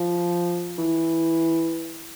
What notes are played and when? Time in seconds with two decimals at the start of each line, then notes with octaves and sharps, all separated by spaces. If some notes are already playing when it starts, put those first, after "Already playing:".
Already playing: F3
0.78 E3